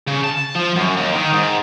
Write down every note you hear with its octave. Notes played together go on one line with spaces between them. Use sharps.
C#3
A5
F3
F#2
D#2
D#3
G#2